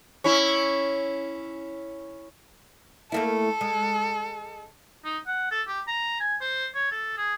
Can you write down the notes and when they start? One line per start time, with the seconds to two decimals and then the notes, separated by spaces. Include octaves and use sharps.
0.24 C#4 E4
3.12 A3 A#3 E4 A4
3.61 G#3
5.04 D#4
5.27 F#5
5.51 A4
5.67 G4
5.87 A#5
6.20 G#5
6.41 C5
6.75 C#5
6.91 A4
7.17 G#4